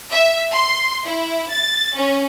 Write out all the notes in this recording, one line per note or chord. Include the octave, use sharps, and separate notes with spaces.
E5
C6
E4
A6
C#4